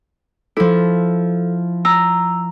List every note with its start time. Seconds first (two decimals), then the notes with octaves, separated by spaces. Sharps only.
0.57 F3 E4 A4
1.85 A#5 E6